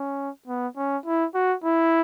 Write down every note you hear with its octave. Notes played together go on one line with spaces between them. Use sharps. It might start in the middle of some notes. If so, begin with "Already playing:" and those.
Already playing: C#4
B3
C#4
E4
F#4
E4